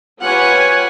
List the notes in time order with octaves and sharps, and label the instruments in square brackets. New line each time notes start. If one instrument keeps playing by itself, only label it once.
[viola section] F4 G4 B4 C#5 F#5 G#5